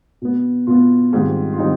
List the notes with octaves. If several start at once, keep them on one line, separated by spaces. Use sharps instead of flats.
B2 B3
B2 B3 F4
G#2 D#3 G3 C4 F4
F4
D#3 G3 C4 D#4